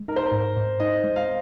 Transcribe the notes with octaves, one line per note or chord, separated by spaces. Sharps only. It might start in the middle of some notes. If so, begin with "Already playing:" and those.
Already playing: G#3
D#4 A#4
C5
A#4
G#2
G#2
D#4 D#5
G#3
F5